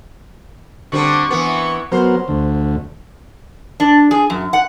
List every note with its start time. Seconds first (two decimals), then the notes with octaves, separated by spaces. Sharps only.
0.92 D3 G3 C4 C#6
1.31 E3 B3
1.92 F#3 B3 A#4 C5
2.28 D2
3.80 D4
4.11 G#4
4.30 F#2
4.53 F#5